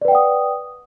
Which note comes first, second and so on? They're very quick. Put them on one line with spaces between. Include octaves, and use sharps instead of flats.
D5 B4 G5 F#5 D#6